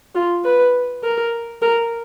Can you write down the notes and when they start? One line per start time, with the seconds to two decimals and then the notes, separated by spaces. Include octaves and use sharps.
0.15 F4
0.44 B4
1.04 A#4
1.62 A#4